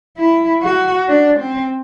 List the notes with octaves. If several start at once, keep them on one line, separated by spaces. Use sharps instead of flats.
E4
F#4
D4
C4